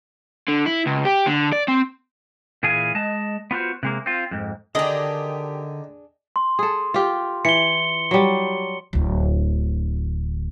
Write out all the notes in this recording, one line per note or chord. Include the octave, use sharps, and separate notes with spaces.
D3
E4
C#2
G4
D3
D5
C4
A#2 E3 G#4 F5 G#5
G#3 D#5 A5
B3 F4 F#4 C5
C3 G#3 A#3
C4 F4
F2 G#2
D3 D#3 D4 G4 G#4 D#5
C6
G#4 A4
F4 G4
E3 C#7 G7
F#3 G3
D1 D2